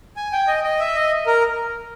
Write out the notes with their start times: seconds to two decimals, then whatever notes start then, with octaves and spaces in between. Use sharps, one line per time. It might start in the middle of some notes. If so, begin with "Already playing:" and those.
0.17 G#5
0.32 G5
0.48 D#5
0.64 D#5
0.80 E5
0.95 D#5
1.27 A#4